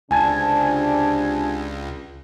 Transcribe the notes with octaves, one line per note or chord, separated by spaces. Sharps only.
C#2 C3 D4 G#5 A5 G#6